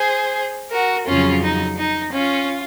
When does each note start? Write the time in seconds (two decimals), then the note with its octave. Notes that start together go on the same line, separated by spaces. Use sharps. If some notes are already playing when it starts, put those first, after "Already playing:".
Already playing: G#4 C5
0.72 F#4 A#4
1.07 F2 C#3 F#3 C#4 F4
1.42 D#4
1.78 D#4
2.13 C#4 F4